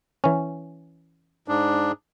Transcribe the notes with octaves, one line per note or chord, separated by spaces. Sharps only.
E3 C#4
G#2 D4